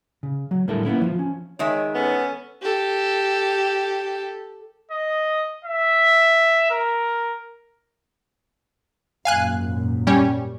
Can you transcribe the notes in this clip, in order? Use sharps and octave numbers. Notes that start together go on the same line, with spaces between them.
C#3
F#3
A2 D3 G3 A4 A#4 E5
A#3 B3 C#4 E4
F3 F4
F3 C#4
D#3 G#3 C#5 E5
B3 C#4 A4
G4 A4
D#5
E5
A#4
G#1 F#2 A#2 F5 G#5 F#6
G3 C#4